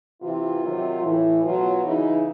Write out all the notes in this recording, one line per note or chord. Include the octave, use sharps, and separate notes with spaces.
C3 E3 F4
C3 D#3 F#3
A2 E3
B2 F#3 F4
C#3 E3 D#4